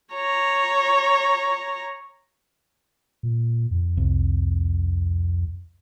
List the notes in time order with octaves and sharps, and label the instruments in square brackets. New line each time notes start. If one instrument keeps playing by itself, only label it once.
[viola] C#5 A#5
[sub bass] A#2
F2
[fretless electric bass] C2